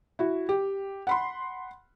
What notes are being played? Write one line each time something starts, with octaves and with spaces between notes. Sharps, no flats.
E4 F#4
G4
F#5 B5 C6